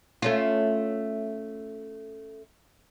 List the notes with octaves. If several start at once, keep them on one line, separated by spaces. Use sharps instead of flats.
A3 C#4 F4